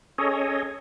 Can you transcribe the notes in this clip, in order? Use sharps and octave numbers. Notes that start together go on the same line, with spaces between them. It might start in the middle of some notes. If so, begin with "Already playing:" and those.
C#4 G#4 A4 C#5 D#5